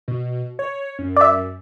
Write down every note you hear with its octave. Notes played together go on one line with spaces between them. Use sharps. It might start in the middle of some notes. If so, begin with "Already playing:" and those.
B2
C#5
F#2
D5 E5